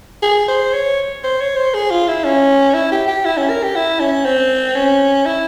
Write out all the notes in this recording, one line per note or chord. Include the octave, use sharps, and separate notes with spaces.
G#4
C5
C#5
C5
C#5
C5
G#4
F4
E4
C#4
E4
G4
G4
E4
C#4
A#4
G4
E4
C#4
C4
C#4
E4